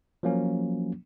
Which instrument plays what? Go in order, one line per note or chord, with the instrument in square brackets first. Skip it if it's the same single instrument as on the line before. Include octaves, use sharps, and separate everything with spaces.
[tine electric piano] F3 F#3 A#3 C#4